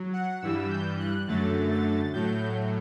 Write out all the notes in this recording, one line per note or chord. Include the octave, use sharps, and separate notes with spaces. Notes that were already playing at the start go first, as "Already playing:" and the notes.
Already playing: F#3
F#5
G2 E3 G3 E6
G6
F#6
F#2 D3 F#3 A3 A6
A6
A2 F#3 A3 G6